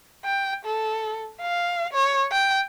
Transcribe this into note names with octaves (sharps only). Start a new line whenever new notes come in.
G5
A4
F5
C#5
G5